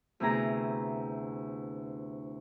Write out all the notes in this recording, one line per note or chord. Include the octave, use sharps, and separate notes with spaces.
D2 C3 B3 E4 G#4 A#5